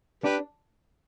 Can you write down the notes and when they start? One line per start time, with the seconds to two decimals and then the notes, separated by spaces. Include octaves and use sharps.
0.24 D4 G4 B4